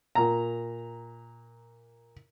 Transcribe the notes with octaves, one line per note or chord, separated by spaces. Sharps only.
A#2 A#5